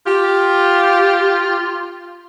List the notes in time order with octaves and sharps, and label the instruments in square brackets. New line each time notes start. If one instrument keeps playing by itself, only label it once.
[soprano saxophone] F4 [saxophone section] G4